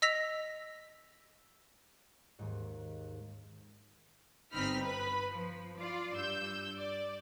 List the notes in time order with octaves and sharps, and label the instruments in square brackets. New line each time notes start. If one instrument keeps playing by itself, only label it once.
[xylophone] D#5 E6 A#6 B6 F7
[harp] D#2 G#2
[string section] G1 C4 D#4 B5 F6 B6
B4 B5
F3
F4 D5
G2 E6 G6
D5